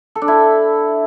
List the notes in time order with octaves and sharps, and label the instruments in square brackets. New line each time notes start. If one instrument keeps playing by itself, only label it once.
[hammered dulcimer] A4
D4
E4